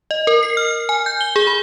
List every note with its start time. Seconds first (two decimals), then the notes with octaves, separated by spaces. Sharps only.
0.11 D#5
0.27 A#4
0.43 C7
0.57 F6
0.89 G#5
1.06 G6
1.21 G7
1.36 G#4
1.47 B5